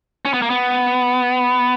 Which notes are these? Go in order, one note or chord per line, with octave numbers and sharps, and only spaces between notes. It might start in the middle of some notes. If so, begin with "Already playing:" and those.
C#4
B3
A#3
B3